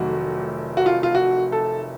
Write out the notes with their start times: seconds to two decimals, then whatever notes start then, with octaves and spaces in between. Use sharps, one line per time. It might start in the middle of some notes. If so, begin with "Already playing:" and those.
Already playing: F1 F2 D#3 F#3 A3 F#4
0.77 F#4
0.86 F4
1.03 F4
1.15 F#4
1.52 A4